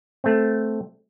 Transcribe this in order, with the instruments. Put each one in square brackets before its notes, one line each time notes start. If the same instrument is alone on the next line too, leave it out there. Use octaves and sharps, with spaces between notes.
[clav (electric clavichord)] A3 C4